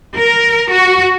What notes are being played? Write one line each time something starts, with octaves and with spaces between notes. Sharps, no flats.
A#4
F#4